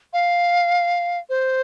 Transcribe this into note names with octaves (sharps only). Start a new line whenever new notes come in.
F5
C5